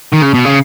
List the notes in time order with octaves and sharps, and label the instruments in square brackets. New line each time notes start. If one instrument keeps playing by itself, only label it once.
[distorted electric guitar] D#3
C#3
B2
C#3